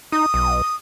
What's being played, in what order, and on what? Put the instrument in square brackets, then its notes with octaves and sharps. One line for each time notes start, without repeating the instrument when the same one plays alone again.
[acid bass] D#4 [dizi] D#6
[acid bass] B1